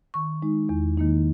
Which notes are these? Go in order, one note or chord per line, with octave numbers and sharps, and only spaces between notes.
D#3 C#6
G#3 D#4
E2
D#3 A#3 D#4